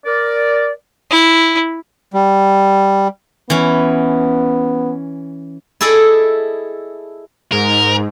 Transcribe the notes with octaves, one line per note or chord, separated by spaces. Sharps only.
A#4 D5
E4
G3
E3 B3 C#4
E4 G#4 A4 D5 D#5
G#2 A#4